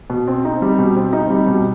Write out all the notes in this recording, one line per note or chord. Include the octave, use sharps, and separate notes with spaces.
B2
C4
D#4
G3
B2
C4
D#4
G3
B2